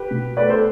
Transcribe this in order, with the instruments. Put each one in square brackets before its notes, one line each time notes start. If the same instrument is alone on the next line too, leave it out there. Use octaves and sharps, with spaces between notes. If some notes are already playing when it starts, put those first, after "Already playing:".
Already playing: [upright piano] G4 B4
B2
A3 B4 D5
A4 C5